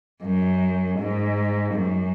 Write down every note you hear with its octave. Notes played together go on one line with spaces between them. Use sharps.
F#2
G#2
F#2